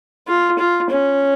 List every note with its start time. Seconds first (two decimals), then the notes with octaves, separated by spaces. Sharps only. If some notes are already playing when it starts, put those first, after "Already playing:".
0.28 F4
0.59 F4
0.90 C#4